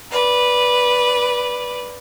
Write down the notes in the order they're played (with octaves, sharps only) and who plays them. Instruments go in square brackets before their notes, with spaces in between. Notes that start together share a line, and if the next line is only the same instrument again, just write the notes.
[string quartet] B4 D5